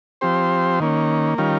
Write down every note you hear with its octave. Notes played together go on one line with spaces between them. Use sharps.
F3 C4 G4 C5
D#3 A#3 C#4
D#3 G3 C#4 F4 A#4